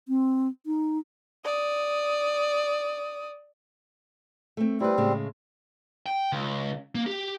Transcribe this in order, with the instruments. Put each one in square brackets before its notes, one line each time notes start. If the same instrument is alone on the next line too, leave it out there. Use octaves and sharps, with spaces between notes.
[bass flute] C4
D#4
[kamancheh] D5 D#6
[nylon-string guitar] A3 C4
[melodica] G3 C4 [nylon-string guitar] E4 B4
[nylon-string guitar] A2 C#3 G#3
[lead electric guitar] G5
C#2
A#3
G4